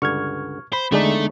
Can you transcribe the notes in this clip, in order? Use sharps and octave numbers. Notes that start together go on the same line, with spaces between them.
C#2 G2 D3 C#6 F6 G#6
C5 B5
E2 D3 G#3 A3 D4 D#4 D5